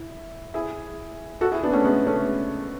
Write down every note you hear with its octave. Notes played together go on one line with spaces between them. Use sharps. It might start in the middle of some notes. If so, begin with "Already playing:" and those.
Already playing: E4
E4 G#4
F#4 A4
E4 G#4
B3 D4
A3 C#4
G#3 B3
A3 C#4